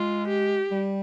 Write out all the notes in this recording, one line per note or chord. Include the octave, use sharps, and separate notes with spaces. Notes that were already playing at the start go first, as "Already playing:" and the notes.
Already playing: G#3 F4
G4
G3